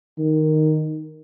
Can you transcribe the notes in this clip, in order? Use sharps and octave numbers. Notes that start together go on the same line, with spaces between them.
D#3